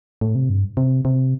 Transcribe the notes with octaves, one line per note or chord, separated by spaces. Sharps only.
A2
C3
G2
C3
C3